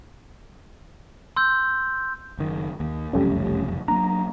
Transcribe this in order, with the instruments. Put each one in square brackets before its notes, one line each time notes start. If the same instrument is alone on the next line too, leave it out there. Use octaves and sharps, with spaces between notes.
[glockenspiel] C6 E6 G6
[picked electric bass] F#1 D#3
D#2
[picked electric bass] F#1 C2 F2 [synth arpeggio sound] G3 A3 C#4
[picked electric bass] F#3 A#3 D4 [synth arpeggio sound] A#5